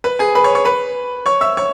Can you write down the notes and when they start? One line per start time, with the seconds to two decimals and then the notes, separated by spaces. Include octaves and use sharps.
0.04 B4 B5
0.19 G#4 G#5
0.35 B4 B5
0.44 C#5 C#6
0.55 C#5 C#6
0.65 B4 B5
1.26 C#5 C#6
1.41 E5 E6
1.57 C#5 C#6